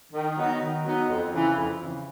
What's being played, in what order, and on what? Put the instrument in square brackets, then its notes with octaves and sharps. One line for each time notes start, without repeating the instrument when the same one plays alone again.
[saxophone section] D#3
F#3 B3 D#4 F#4
D#3
F#3 B3 D#4 F#4
F2
C#3 E3
F2
C#3 E3